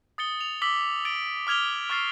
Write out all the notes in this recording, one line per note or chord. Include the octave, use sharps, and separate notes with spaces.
D#6 A6 C#7 G7
F7
D6 E6 B6 F#7 G7
A6 D7 G7
D6 F6 G#6 F7 G7
C#6 F6 A6 C7